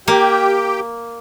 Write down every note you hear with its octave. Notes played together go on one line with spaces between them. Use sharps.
A#3 G4 G5